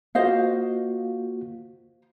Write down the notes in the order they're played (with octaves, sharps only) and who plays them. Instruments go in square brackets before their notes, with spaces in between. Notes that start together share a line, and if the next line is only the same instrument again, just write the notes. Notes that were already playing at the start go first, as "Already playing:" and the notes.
[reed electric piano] A#3 F4 F#4 [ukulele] C5 D#5 F5